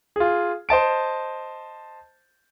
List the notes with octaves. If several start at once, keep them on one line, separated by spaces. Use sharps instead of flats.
F4 G#4
C5 D#5 A5 D7